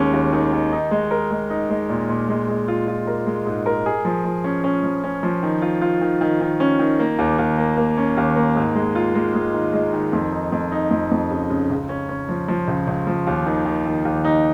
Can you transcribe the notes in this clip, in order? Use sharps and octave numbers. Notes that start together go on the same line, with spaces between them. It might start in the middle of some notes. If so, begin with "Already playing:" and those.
Already playing: D#2 D#3 G#3 C#4
D#2
D#3
D#3
D#4
G#3
A#4
G#3
D#4
G#3
A#2
A#2
G#3
G#3
F4
F4
A#4
G#3
G#2
A#4
G#4
F3
F3
C#4
C#4
F3
C#4
F3
D#3
F4
F4
D#3
D#3
D#3
C#4
D#3
A#3
D#2
D#2
A#3
A#3
C#4
D#2
A#3
G#2
G#3
F4
G#3
G#3
D#3
G#3
D#3
F2
D#4
F2
D#4
F2
F2
C#3
C#3
C#2
C#4
C#4
F3
F3
C#2
C#2
F3
D#2
D#3
D#3
D#3
D#2
D#4